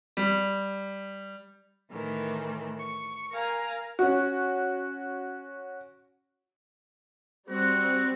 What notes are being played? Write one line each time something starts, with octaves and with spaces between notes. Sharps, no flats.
G3
A2 D#3 E3
C#6
A#4 F5 G#5 A#5
C#4 F#4
G3 C4 F#4